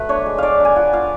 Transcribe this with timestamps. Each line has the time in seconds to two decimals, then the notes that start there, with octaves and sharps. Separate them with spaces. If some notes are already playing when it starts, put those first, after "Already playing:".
Already playing: F#3 A3 B4
0.09 D4 C#5
0.26 G#3
0.38 D4 D5 F5
0.60 D4 G#5
0.76 F4 F#5
0.93 F4 F5